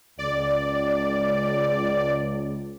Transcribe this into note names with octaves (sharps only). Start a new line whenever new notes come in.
C#2 D5